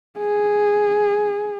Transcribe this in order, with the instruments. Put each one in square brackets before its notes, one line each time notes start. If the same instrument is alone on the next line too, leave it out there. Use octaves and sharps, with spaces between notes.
[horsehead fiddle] G#4